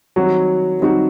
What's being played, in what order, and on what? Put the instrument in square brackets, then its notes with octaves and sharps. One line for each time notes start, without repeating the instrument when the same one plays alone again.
[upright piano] D#3 G3 C4 D#4 F#4 [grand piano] F#3
[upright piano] D#3 G3 C4 D#4 F#4